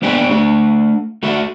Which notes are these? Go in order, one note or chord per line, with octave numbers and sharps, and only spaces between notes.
A#3 B3 D4 G4 G5 G#5
A3 D4 A4
A3 F#4 A4 E5